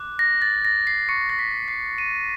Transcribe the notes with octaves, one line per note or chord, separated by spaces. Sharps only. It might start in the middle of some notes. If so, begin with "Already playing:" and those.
Already playing: D6 F#6
A#6
A6
A#6
C7
C#6 F#6 C#7
A#6
B6
C7
D#7